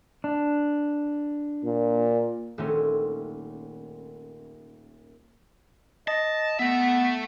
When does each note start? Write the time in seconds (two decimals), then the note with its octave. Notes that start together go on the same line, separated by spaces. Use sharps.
0.24 D4
1.65 A#2
2.58 D#1 A3 C4 C#4
6.08 D#5 A5
6.59 A3 B3 E5